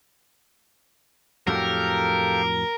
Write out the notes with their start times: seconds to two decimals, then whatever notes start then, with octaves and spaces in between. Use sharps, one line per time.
1.47 F2 A2 F#3 G4 A4 A#4 F5